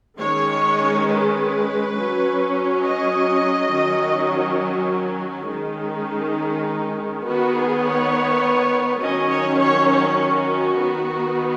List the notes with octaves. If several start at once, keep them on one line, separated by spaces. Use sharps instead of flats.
D#3 G#3 C#4 C#5
B4
F#3 C#4
D#5
D#3 F#3 C#4
D#3 G#3 C#4 D#4
D#3 B3 F#4
G#4
C#5
D#3 F#3 C#4 D#5
C#5
C#5
C#5
F#4
D#3 B3